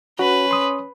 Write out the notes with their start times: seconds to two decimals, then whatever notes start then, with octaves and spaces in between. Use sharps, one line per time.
0.19 C#4 F#4 B4
0.51 C6 D#6